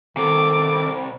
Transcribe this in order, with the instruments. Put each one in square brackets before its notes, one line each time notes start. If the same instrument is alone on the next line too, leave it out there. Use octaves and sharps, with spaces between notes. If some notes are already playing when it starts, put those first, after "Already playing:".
[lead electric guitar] C2 C3 [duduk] D#3 [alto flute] A4 [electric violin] D6